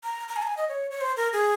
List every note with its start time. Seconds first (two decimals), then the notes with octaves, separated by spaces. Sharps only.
0.04 A#5
0.28 A#5
0.36 G#5
0.42 A#5
0.47 G#5
0.57 D#5
0.69 C#5
0.91 C#5
1.01 C5
1.17 A#4
1.33 G#4